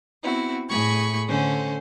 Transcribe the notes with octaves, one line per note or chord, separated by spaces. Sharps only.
B3 C4 E4 F#4
A2 A3 G#4 B5 C#6 G#6
D3 A3 C#4 C5